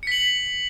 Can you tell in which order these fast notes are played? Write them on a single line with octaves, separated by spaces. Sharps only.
C#7 B6 F#7